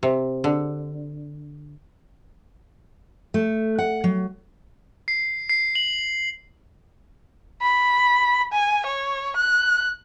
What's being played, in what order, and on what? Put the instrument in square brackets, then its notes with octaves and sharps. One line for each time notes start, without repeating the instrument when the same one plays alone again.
[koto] C3
D3
[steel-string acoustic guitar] A3
F#5
F#3
[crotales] C7
C7
F#7
[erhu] B5
G#5
C#5
F#6